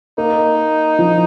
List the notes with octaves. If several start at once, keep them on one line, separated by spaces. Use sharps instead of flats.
A#3 D#4
F3